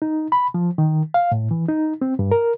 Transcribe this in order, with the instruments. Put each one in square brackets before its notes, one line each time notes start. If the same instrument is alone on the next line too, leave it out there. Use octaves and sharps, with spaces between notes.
[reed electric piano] D#4
B5
F3
D#3
F5
A2
E3
D#4
C4
G2
A#4